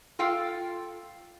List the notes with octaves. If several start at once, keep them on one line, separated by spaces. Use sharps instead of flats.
F4 A4 F5 G5